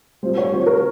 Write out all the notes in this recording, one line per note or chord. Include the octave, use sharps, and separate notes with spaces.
G3 C4 F4 C5
C#5
G3 C4 F4 C5
A#4